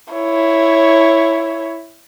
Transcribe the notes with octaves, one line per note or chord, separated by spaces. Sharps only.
E4 C#5